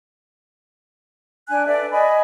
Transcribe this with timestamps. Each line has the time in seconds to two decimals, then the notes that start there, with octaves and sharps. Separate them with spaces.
1.49 D4 G#5 F#6
1.66 A4 B4 D5 E5
1.91 D#5 G#5 B5